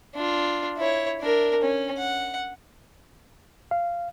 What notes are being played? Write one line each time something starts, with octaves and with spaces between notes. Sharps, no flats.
D4 F4
E4 C#5
D4 A#4
C#4
F#5
F5